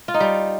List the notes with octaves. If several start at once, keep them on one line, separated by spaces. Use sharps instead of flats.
F4
D#4
G3